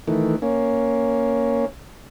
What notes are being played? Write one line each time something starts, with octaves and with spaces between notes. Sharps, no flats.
D#3 E3 A3
A#3 C#4